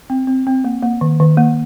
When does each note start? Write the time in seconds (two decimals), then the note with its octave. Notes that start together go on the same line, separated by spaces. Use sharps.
0.10 C4
0.27 C4
0.47 C4
0.64 A#3
0.83 A#3
1.01 D#3
1.20 D#3
1.37 A#3